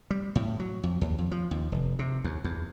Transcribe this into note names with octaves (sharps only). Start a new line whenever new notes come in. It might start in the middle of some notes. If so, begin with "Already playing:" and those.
G3
A2
F#3
F2
D#2
F2
F3
D#2
F1
C3
D#2
E2